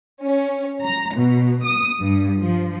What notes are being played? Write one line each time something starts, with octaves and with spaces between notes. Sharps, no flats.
C#4
A#5
B2
D#6
G2
F3